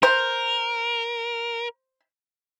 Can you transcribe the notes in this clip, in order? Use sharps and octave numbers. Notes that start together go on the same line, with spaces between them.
A#4 C5